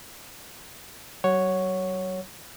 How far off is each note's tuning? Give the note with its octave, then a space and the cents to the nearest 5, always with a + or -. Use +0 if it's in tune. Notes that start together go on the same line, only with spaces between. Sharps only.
F#3 +40 C#5 +0 F#5 +0